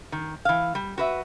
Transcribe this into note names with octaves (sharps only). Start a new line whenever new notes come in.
D#3
E3 F5
G3
F#4 B4 E5